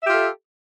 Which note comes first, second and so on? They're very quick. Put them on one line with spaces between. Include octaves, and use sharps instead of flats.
E5 G4 F4 A4